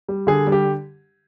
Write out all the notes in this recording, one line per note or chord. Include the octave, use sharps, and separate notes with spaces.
G3
D3 G#4
G3
G4